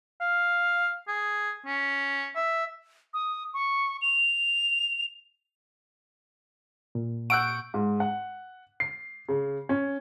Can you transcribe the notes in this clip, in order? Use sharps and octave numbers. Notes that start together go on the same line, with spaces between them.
F5
G#4
C#4
E5
D#6
C#6
F7
A#2
F#5 C#6 E6 F#6 G6 D7
G#2
F#5
C7
C#3
C#4